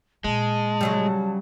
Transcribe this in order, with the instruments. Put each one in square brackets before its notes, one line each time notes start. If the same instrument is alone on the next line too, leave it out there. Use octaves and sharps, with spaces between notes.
[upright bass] A#2 [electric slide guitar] G#3 [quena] A5
[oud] C#3 F#3 G3